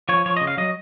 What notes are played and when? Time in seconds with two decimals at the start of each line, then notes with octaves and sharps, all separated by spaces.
0.09 F3 C#5
0.26 F3 C#5
0.37 D#5
0.41 C#3
0.47 F5
0.57 F#3 D#5